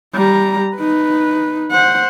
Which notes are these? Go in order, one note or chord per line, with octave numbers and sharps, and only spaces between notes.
G3 A#5
D#4 B4
C5 F#5